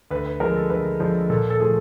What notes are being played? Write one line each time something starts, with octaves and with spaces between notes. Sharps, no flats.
D2 B4
B4
D3 F3 G#3 A#4
A4
D2 B4
D3 F3 G#3
A#2 A4
A4
F3 A3 G#4